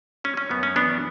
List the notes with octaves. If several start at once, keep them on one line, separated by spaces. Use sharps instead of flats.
G3 C#4
C#4
F#2 B3
C#4
E3 B3 D4